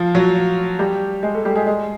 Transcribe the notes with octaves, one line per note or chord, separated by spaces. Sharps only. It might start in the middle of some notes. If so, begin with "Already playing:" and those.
Already playing: F3 F4
F#3 F#4
G3 G4
G#3 G#4
A3 A4
G3 G4
G#3 G#4
G#3 G#4